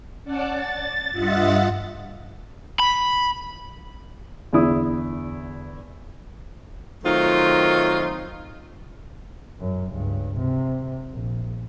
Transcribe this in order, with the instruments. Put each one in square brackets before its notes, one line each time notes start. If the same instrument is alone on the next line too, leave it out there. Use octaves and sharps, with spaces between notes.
[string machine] C#4 D5 F#5 A5
A6
G2 F4 D#5 E5 F#5 A6
[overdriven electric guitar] B5
[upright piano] E2 D3 E4 D#6
[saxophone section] D#3 F#3 A3 C4 D#4 F4
[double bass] F#2
C#2 G2
C3
A#1